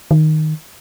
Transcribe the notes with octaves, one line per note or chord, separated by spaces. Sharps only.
D#3